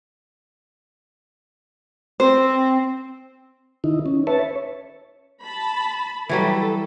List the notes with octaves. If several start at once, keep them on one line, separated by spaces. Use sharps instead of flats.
C4 C5
D#3 D#4 E4
C#4
B4 C#5 E5 A5
C#5
A5 B5
E3 F#3 G3 A4